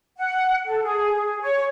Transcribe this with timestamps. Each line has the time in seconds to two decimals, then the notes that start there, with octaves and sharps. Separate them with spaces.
0.18 F#5
0.66 A4
0.83 G#4
1.14 G#4
1.41 C#5